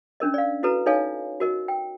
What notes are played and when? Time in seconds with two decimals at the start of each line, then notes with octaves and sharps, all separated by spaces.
0.20 C#4 D4 A#4 D#5
0.34 D5 F5
0.63 E4 F#4 A4 B4 A#5
0.86 D#4 A4 C#5 D#5 F5 G#5
1.40 F#4 A#4 D#5
1.68 G5